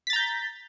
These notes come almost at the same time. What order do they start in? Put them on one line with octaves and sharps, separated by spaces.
B6 A6 A#5 G6